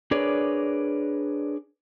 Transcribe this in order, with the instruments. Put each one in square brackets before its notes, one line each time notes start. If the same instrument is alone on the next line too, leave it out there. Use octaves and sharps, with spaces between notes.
[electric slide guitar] D4 G#4 A#4 B4 C#5 D5